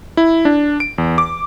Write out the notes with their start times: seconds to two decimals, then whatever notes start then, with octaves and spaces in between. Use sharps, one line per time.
0.17 E4
0.45 D4
0.80 D7
0.98 E2
1.18 D6